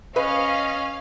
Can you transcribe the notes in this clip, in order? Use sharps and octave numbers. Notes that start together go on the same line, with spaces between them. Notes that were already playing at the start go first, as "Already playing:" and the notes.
C#4 B4 D#5 F5